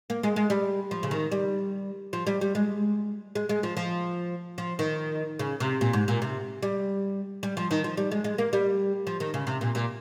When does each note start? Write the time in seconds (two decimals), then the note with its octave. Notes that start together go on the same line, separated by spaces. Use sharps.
0.10 A#3
0.23 G#3
0.36 G#3
0.50 G3
0.91 F3
1.03 C#3
1.11 D#3
1.31 G3
2.13 F3
2.27 G3
2.41 G3
2.55 G#3
3.35 G#3
3.49 G#3
3.63 F3
3.77 F3
4.58 F3
4.79 D#3
5.39 C#3
5.60 C3
5.81 A#2
5.93 G#2
6.08 A#2
6.22 C3
6.63 G3
7.43 G3
7.57 F3
7.71 D#3
7.84 F3
7.97 G3
8.11 G#3
8.24 G#3
8.38 A#3
8.53 G3
9.07 F3
9.20 D#3
9.34 C#3
9.47 C3
9.61 A#2
9.75 A#2